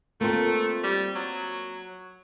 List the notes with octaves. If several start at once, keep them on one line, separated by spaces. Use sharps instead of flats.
A3 A#3 C4 F4
G3
F#3